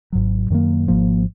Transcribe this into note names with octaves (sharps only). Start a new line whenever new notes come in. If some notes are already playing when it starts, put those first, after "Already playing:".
G#1 G#2 F#3
F#2 D#3 F#3 A#3
G#1 G#2 F3 A#3